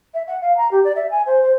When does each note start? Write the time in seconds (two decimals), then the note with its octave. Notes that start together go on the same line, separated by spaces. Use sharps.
0.14 E5
0.27 F#5
0.41 F5
0.57 A#5
0.71 G4
0.84 D5
0.95 E5
1.11 G#5
1.26 C5
1.42 C5